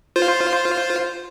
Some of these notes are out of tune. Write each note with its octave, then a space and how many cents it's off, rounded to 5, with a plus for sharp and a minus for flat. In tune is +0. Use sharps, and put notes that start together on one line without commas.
F4 +0 C5 +0